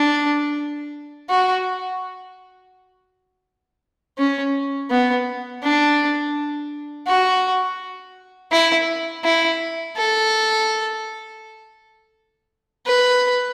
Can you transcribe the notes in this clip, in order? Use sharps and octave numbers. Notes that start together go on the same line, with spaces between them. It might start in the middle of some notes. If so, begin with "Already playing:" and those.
Already playing: D4
F#4
C#4
B3
D4
F#4
E4
E4
A4
B4